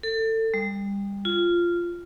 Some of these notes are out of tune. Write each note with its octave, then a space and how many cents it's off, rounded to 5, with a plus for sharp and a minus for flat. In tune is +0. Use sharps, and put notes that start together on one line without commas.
A4 +25
G3 +25
F4 -10